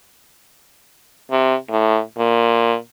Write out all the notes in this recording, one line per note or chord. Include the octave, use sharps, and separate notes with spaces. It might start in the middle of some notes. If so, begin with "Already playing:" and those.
C3
A2
A#2